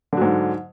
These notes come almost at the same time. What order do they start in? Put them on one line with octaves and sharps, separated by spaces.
D3 F#3 G#2